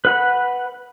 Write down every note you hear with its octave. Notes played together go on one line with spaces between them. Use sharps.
B4 F#5 B5